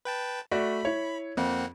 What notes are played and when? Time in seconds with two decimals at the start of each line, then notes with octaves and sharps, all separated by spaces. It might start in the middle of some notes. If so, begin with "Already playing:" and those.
0.05 B4 G5 A5
0.51 A3 F#4 D5 B5
0.85 E4 C#5
1.37 F2 A#3 C4 F#5